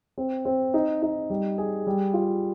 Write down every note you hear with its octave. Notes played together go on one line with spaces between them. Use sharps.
C4
C4
D#4
D#4
G3
G#4
G3
F4